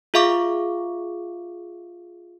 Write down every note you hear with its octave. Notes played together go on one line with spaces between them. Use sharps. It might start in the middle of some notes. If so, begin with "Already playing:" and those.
F4 G#4 E5 F5 C#6 D6